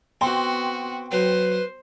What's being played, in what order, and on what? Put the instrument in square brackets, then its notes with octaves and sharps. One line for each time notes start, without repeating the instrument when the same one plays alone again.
[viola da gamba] B3 F#4 [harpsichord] C4 [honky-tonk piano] G5 C6
[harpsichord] F#3 [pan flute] B4 [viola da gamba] C5